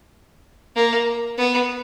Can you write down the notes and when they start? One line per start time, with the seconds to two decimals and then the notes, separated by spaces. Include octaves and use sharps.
0.76 A#3
1.38 B3